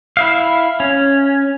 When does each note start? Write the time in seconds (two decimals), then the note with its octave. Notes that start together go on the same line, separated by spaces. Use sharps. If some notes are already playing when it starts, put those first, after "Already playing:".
0.17 E4 E5 F5
0.80 C#4